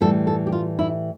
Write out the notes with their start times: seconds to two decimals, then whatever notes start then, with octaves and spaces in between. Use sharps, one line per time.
0.01 A2 E3 G3 A4
0.27 A4
0.47 G4
0.52 F4
0.79 E4